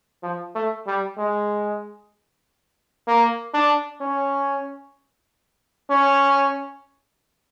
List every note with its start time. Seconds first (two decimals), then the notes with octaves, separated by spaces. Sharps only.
0.23 F3
0.55 A3
0.87 G3
1.18 G#3
3.07 A#3
3.54 D4
4.01 C#4
5.90 C#4